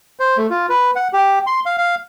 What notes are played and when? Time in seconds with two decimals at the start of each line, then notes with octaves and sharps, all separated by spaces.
0.20 C5
0.37 A3
0.50 F4
0.69 B4
0.96 F#5
1.13 G4
1.47 C6
1.66 F5
1.78 F5